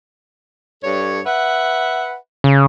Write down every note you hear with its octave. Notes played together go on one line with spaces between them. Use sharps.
G2 A4 C#5
B4 E5 F#5
C#3